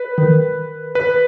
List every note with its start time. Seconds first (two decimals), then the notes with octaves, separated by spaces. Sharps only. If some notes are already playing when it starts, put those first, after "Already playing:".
Already playing: B4
0.18 D#3
0.95 B4